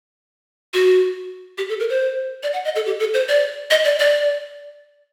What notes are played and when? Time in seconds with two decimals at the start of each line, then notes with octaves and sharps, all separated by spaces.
0.74 F#4
1.58 G4
1.69 A4
1.80 A#4
1.90 C5
2.43 D5
2.53 F#5
2.65 D#5
2.76 A4
2.86 G4
3.00 A4
3.14 C5
3.29 D5
3.71 D#5
3.84 D5
4.00 D5